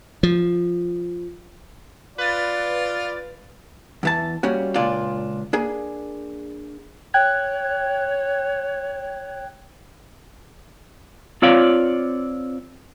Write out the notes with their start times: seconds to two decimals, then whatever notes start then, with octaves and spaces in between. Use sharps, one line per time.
0.23 F3
2.18 F4 B4 D5 A6
4.03 E2 E3 A5
4.43 G3 A#3 C#4 F#4
4.76 C#2 A#2 D4 F4 D5
5.53 A#3 D4 G#4
7.14 C#5 G5 F#6 G#6
11.42 C4 F4 C#5 D5 F5